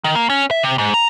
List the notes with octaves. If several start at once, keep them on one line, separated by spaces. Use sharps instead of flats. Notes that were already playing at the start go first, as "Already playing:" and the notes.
D#3
A#3
C#4
E5
C3
G#2
A#5